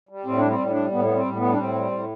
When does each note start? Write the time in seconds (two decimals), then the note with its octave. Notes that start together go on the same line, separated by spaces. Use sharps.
0.09 G3
0.25 A2 C4
0.37 G3 D4
0.47 C4
0.59 A2
0.70 D4
0.75 G3
0.91 A2 B3
1.05 G3 B3
1.14 C4
1.25 A2
1.36 B3
1.42 G3
1.52 D4
1.58 A2 C4
1.75 G3
1.91 A2